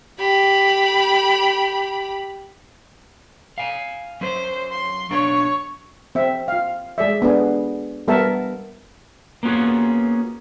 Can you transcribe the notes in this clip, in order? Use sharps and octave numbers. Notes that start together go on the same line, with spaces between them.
G4 B5
F5 G#5
F#3 C#4 C5
C6
B1 D4 C#5 C#6
C4 E5
F4 F5
G#3 G#4 D5 E5
B3 D4 G#4
G3 B3 A#4 E5 F#5 A5
A#3 B3 C#4 F4 F#4 G#4